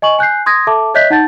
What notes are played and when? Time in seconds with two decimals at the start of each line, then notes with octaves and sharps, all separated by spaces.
0.02 D#5 G#5 C#6 F#7
0.19 G#5 F#6 G6 C7
0.46 C6 D#6 G#6 A#6
0.67 A4 E5 A5 D6
0.94 C#5 D#5 E5 F#6 G6 B6
1.10 D#4 F#5 A5 G6 A6